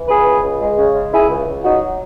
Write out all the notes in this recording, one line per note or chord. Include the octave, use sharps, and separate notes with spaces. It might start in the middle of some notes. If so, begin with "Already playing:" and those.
Already playing: E3
C#2 G#4 B4
C#2
C#2
G#3
C#3
G#3
C#2 E4 G#4
C#2
C#2
F#3 D#4 F#4